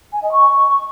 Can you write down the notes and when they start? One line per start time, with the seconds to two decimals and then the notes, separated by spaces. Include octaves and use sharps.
0.13 G#5
0.22 D#5
0.32 C#6